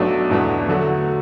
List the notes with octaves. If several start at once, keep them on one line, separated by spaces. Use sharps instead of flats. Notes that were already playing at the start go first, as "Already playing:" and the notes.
Already playing: B1 B2 F#3 A3 D4
E2 B2 A3 D4 B4
D3 F#3 A3 F#4